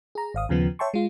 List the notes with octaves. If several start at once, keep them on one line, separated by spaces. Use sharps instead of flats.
G#4 A#5
G#1 F5 D#6
D#2 C#3 F3 B3
C#5 E5 G5 A5 C6 C#6
G#3 F4